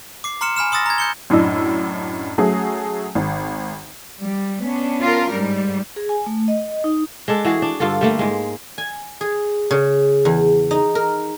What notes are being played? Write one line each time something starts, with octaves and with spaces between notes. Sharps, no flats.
D6 C7
A#5 C6 F6 C#7 E7
G#5 B5 F6 E7
C6 D#6 E6 A6 A#6
A#5 G#6
G6 C#7 G7
F#2 A2 D4 D#5 E6
F#3 A3 C#4 G#4
G#1
G3
B3 C#4 D4
F4 A#4
G#2 G3
G#4
G#5
A3
D#5
D#4
G#3 D4 A4
E3 F#4 G#4
D4
G2 D3 F4 A4
G3 A3 A#3
G#2 G#3
G#5
G#4
C#3
E2
D#4
A#4